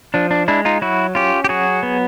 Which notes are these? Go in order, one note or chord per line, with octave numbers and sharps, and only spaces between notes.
F3 D4
D4
G#3 D4 E4
D#4 F4
F#3 E4 F#4
C#4 F4 G4
G4
F#3 F#4 G#4
B3